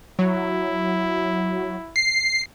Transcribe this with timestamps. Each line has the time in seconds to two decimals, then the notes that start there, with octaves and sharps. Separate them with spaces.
0.19 F#3 E4
1.96 C7